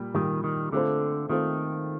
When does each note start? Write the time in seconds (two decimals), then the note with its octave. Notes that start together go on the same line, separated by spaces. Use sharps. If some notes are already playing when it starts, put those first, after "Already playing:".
Already playing: A#2 G3
0.14 A#2 D#3 G3 A#3
0.44 D#3
0.72 D3 A3 C4 F4 A4 C5
1.29 D#3 A3 C4 F4 A4 C5